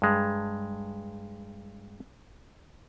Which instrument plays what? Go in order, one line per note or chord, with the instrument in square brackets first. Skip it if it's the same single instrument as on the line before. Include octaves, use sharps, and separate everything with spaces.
[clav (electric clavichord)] G2 G#3